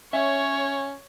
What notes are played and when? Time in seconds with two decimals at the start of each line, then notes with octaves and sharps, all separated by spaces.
0.13 C#4 C#5 E5